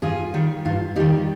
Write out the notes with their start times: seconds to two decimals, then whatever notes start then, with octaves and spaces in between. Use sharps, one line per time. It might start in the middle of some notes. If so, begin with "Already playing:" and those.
0.02 G2 F4 G#4
0.34 D#3 G3
0.65 G2 F4
0.96 D#3 G3 D#4 G4